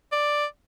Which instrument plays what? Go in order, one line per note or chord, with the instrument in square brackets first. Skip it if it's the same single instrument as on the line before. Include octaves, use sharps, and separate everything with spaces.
[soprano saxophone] D5